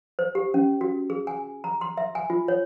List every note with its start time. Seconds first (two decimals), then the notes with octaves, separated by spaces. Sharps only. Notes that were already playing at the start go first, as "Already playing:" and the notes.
0.19 C5
0.35 G4
0.54 C#4
0.81 F#4
1.10 G#4
1.27 G#5
1.64 A#5
1.81 C6
1.97 E5
2.15 G#5
2.30 F4
2.48 C#5